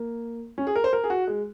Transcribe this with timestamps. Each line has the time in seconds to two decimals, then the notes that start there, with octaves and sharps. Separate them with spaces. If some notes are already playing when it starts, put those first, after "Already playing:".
Already playing: A#3
0.58 C#4
0.67 G#4
0.76 A#4
0.84 C5
0.93 A#4
1.04 G#4
1.10 F#4
1.27 G#3